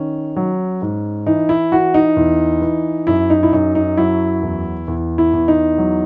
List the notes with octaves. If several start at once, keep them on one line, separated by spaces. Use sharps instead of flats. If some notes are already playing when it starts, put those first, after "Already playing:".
Already playing: D#3 C#4
F#3
G#2
E3 D#4
E4
E3 F#4
D#4
E2
E3
F#2 E4
D#4
E4
F#2 D#4
D#4
F#3 E4
E2
E2
E4
E2
D#4
F#3